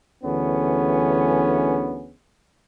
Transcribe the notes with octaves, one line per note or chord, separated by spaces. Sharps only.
D2 D3 E3 B3 C#4 G#4